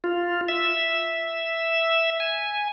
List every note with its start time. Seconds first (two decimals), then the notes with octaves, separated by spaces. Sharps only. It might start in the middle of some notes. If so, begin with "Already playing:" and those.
0.04 F4
0.49 E5
2.20 G#5